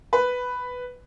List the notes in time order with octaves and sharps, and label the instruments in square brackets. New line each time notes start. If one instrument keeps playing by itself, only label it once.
[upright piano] B4